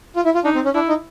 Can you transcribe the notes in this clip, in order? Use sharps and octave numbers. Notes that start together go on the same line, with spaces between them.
F4
E4
F4
D4 D#4
C4
C#4
D4 E4
D#4